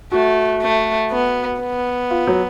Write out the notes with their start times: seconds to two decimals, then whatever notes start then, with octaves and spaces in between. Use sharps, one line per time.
0.12 A3 F#4
0.62 A3
1.11 B3
1.61 B3
2.10 F4
2.27 F#3